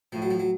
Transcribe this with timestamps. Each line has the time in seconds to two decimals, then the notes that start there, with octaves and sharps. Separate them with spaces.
0.12 A2 F3
0.22 F#3
0.31 F3
0.40 F#3